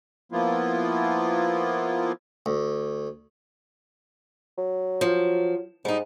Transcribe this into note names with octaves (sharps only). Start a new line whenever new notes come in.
F3 A#3 B3 E4 F4
D2
F#3
F3
G#2 G3 D#4